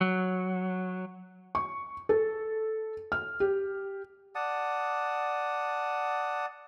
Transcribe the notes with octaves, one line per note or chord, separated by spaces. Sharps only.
F#3
C#6
A4
F6
G4
D5 F#5 A5 D#6